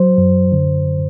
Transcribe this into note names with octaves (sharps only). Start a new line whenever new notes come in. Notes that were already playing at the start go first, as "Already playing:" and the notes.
Already playing: F#3 C5
F#2
D3